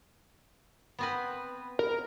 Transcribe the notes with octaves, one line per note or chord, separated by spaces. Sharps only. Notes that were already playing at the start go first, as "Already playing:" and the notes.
B3 C4 B4
A#4